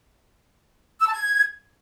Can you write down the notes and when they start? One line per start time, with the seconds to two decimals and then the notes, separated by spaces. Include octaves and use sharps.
1.00 E6
1.07 A5
1.13 G#6